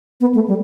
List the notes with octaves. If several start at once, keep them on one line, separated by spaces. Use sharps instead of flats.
B3
A3
G3